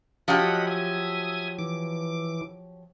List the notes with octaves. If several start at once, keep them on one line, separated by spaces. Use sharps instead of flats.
F3 F#3 G4 D#5 F#5 B5
E5 G#5 D#6
E3 D6